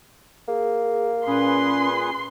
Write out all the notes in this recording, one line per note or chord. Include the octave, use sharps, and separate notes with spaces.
A#3 G#4
A#2 C#4 G#4 B4 C6